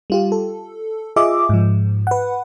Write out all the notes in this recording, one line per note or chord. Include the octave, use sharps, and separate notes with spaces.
G3 F4 G4
A4
F4 G#4 D#5 E5 D6
G#2 F3
B4 F#5